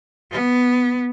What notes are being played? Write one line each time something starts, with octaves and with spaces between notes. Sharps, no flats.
B3